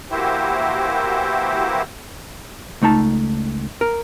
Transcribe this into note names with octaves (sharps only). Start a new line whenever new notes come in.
E3 A#3 E4 F#4 G4 C5
C#2 A3 D#4 A5
A#4